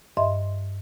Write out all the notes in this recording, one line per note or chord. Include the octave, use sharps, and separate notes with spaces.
G2 D#5 E5 C6